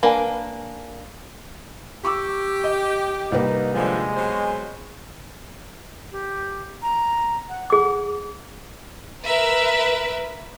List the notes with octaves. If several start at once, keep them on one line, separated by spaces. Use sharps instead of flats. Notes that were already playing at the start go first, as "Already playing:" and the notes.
A#3 D4 A#4 B4 F5 G#5
G4 C#6 D6 E6
D#5
C2 A#3 D#4 B4
G2 D3 F3 G#3
B2 F#3 C5
G4
A#5
F#5
G#4 F#5 D6
A#4 B4 E5